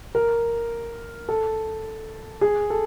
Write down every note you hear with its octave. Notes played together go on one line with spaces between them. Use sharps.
A#4
A4
G#4
A4